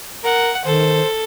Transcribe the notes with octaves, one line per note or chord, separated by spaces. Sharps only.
A#4 F#5
D#3 A4 C5